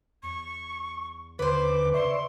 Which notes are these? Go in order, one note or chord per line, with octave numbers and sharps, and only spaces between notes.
E2 C#6
D#2 D3 B4 C5 D6
C#3 D5 E5 C6 C#6